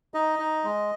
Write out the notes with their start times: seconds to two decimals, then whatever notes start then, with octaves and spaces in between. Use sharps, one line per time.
0.14 D#4 D#5
0.39 D#4
0.64 G#3